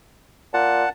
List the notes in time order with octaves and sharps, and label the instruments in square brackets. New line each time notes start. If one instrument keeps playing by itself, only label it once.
[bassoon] A#2 [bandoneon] F#5 A5